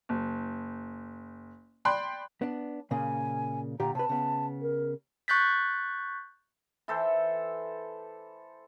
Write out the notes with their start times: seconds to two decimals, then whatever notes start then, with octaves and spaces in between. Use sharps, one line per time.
0.09 F#1
1.85 D5 G5 B5 C6 F#6
2.42 B3 D4
2.91 A#2 C#3 A#3 G#5
3.80 A#2 D3 G4 A#5
3.95 C3 B4 A5
4.09 C#3 B3
4.62 A#4
5.28 C#6 F#6 G6 A6 B6
6.88 E3 A4 C5